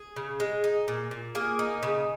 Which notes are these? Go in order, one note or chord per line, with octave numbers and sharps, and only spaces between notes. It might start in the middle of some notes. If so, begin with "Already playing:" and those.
Already playing: G#4
C#3
G#3
D#4
A#2
A#2
A#3 G#4
D#4
C#3